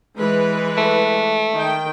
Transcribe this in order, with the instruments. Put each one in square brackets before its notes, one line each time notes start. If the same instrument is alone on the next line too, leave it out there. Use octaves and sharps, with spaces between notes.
[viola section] E3 G#3 B4
[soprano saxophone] A3
[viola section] D#3 G5